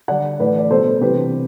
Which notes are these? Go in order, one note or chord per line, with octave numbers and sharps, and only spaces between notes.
D3 G3 D5 F#5
A2 E3 A3 B4 D5
D5
B2 G3 A4 C5
C3 E3 G3 G4 B4